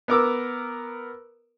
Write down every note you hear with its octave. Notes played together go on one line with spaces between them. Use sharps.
B3 A#4 D6 E6